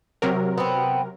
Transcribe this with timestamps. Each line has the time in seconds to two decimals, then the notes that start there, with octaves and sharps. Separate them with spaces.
0.22 C3 F#3 A#4
0.58 B3 C4